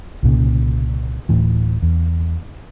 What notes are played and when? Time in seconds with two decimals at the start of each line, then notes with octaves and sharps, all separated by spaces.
0.23 C2 A#2 C#3
1.29 D1 A2 E3
1.82 E2